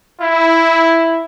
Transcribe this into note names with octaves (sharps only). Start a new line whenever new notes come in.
E4